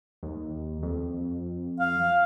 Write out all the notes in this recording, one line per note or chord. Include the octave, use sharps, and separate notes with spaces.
D#2
F2
F5